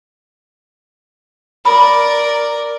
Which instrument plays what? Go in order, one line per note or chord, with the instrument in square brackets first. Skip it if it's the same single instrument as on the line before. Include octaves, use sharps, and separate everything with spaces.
[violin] A#4 D5 [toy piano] B5 D#6